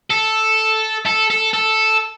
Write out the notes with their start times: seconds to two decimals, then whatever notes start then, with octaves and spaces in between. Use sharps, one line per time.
0.11 A4
1.06 A4
1.30 A4
1.54 A4